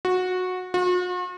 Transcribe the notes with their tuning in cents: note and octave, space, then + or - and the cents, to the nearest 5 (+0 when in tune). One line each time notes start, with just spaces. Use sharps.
F#4 -15
F#4 -45